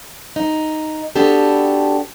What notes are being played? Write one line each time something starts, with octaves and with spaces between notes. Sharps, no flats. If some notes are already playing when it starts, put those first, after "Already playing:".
D#4
B3 D4 F#4 G4 A4